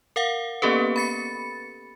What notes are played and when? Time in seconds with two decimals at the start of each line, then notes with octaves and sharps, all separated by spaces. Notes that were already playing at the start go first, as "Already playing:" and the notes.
0.16 A#4 F5 F#5
0.62 A#3 B3 C#4 G4 A4 B4
0.96 B5 A6 C#7